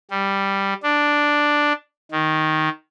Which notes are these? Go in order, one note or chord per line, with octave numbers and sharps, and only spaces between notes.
G3
D4
D#3